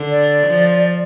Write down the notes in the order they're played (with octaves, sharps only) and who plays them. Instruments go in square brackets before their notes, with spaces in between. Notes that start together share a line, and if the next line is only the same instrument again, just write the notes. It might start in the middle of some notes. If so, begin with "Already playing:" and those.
Already playing: [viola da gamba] D3
[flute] D5
[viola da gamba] F3